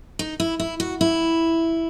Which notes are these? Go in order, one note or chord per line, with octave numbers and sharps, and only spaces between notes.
D#4
E4
E4
F#4
E4